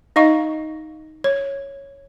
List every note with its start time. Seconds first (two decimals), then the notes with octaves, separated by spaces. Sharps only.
0.16 D#4 D#5 F5 C#6
1.24 C#5